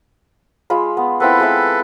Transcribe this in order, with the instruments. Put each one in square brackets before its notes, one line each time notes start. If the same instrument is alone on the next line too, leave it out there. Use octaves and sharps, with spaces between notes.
[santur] G#3 F4 B5
B3
[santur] B3 C4 E4 [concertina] A4 B4
[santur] G#3 E5